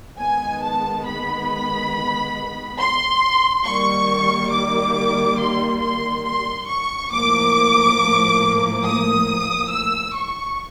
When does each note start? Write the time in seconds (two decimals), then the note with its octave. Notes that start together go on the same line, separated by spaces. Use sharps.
0.18 D#3 G#3 B3 G#5
0.62 A5
1.06 B5
2.79 C6
3.64 D#3 G3 A#3 C#6
4.51 D6
5.39 C6
5.81 C6
6.24 C6
6.68 C#6
7.11 A2 F3 A#3 D6
8.84 D#6
9.71 E6
10.15 C#6